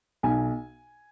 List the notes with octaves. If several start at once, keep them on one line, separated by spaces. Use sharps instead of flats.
B1 G#5